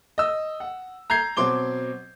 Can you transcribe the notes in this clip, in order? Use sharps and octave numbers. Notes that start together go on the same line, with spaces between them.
D#5 E6
F#5
A#5 G6 G#6 C7
B2 F#3 C4 C6 D6 G7